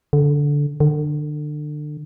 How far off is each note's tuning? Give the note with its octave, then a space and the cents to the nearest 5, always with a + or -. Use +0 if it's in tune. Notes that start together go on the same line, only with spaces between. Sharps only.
D3 -15
D3 +30